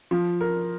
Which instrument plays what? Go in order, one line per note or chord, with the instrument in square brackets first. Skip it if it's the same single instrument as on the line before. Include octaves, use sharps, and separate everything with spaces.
[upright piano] F3
A#4